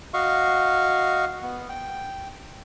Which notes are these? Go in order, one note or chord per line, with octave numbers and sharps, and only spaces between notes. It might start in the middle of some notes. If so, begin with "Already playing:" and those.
F#4 D#5 F5 C#6
B3
G5